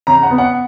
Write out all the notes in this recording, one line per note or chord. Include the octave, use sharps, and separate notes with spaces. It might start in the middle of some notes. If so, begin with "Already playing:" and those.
C#3 A#5
F#5
B3
F#5